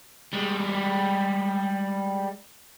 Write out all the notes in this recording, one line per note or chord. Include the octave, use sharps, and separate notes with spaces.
G3 G#3